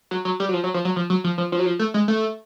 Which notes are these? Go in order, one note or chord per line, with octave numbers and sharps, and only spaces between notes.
F#3
F#3
G3
F#3
F3
F#3
F3
F#3
F3
F#3
F3
F3
F3
F#3
F3
A3
G#3
A3